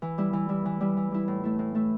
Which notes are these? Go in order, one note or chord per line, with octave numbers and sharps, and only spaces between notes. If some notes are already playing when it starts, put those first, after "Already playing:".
E3
G3 E4
E3
G3 E4
E3
G3 E4
E3
G3 E4
A2
A3 E4
A2
A3 E4